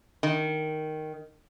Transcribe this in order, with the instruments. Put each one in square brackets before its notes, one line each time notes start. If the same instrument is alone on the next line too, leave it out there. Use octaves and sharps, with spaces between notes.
[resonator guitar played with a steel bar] D#3